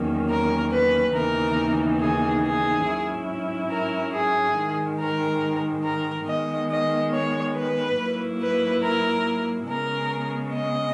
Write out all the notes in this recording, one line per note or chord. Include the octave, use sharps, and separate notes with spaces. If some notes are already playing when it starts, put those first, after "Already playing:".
Already playing: E2 D#3 F#3 A#3 C#4
A#4
B4
D#2 C#3 E3 B3 D#4 A#4
G#4
G#4
G#2 F#3 C#4 E4
A#4
G#4
G#2 D#3 G#3
A#4
A#4
D#3 G#3 B3 D#5
D#5
C#5
B4
G#2 F#3 A#3 E4
B4
A#4
C#3 G#3 B3 A#4
D#5